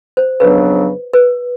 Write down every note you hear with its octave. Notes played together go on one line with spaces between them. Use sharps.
C5
F2 C#3 F#3 B3 D4 B4
B4